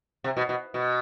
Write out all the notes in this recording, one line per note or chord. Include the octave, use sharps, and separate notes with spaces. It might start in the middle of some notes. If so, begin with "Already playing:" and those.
C3
B2
B2
B2